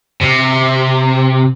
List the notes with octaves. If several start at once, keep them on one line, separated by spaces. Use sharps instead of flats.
C3